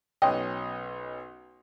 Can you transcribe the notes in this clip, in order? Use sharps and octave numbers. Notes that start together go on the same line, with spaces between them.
B1 C#4 D#5 G5